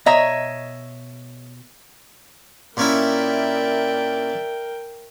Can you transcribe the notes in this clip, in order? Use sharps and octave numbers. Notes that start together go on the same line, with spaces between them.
B2 C#5 D#5 E5 A#5
A#2 C#4 E4 A#4 D5 E5 G5